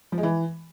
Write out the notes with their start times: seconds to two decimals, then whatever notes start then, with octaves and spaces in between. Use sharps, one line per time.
0.12 F3
0.18 G#3
0.23 E3